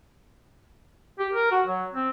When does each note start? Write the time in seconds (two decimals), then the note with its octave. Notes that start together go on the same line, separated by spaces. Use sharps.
1.19 G4
1.33 A#4
1.52 F#4
1.66 F#3
1.93 C4